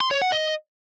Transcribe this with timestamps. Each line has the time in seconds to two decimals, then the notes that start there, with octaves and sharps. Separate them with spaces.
0.01 C6
0.11 C#5
0.22 F#5
0.32 D#5